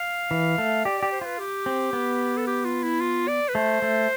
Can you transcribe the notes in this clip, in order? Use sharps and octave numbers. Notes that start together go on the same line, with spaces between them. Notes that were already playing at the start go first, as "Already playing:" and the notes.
Already playing: F5
E3
A3
G4 D5
G4 D5
C5
F4 B4
G4
C4
B3
A4
G4
F4
E4
F4
D5
B4
A3 C5
A3